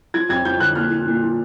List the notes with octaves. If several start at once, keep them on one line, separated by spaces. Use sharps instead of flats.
F3 G#6
F2 G#6
F2 G6
D3 F#6
A#2 F6
F3
A#2
F3